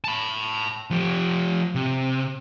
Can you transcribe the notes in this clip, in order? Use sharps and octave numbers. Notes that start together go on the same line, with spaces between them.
A5 B5
F3 G4
C3